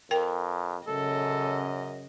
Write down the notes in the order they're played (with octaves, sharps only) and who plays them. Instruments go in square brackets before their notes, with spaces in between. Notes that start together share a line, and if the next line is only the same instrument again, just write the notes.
[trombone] F2 [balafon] A#4 G5
[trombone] F#2 [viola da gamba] C#3 D#5 [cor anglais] A4